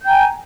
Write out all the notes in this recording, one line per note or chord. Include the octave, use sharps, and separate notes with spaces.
G5 G#5 A#5 G6